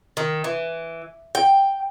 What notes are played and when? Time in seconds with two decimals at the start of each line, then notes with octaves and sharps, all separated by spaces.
0.17 D#3
0.44 E3
1.35 G5